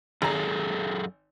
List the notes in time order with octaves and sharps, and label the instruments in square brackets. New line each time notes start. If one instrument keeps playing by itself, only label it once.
[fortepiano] G#1 A#5 [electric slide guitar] F#2 G#4 A4